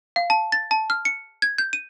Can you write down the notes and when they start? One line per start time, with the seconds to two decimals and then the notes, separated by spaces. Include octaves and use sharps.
0.16 F5
0.30 A5
0.52 A6
0.71 A5
0.90 F6
1.05 C#7
1.42 G#6
1.58 G6
1.73 D#7